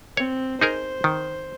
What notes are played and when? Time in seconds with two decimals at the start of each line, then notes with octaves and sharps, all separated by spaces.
0.17 C4 C#5
0.61 D#4 G#4 A#4 C5
1.04 D#3